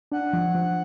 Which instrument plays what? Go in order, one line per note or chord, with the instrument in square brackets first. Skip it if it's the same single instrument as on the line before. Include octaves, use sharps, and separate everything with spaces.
[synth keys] D4 [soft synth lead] F#5
[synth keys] F3
F3